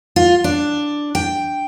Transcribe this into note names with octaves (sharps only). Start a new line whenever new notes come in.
F4
D4
G5